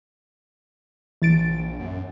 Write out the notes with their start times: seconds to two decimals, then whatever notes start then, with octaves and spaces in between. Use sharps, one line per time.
1.22 A#1 E3 A6 D7
1.79 F#2